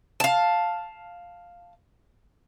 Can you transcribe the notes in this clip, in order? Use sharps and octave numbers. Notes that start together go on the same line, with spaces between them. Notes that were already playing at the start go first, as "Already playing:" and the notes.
F5 A5